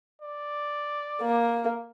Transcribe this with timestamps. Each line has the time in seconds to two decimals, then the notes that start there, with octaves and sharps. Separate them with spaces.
0.22 D5
1.22 A#3